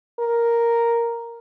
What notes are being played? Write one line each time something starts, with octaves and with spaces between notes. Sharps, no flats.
A#4